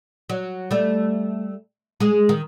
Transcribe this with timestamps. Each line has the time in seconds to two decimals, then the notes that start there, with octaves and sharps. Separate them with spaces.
0.29 F#3
0.71 G3 A3
2.00 G#3 G#4
2.29 D#3